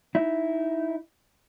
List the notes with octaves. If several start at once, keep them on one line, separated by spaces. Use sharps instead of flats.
D#4 E4